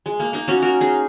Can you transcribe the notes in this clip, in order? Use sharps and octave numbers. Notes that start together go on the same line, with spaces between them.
G#3
A#3
A#3 D#4
C#4 F#4
F#4 A#4
D#4 G#4